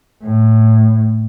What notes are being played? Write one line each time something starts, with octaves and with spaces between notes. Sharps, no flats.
A2